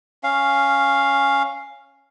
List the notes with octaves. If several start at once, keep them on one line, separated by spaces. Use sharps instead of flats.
C#4 F5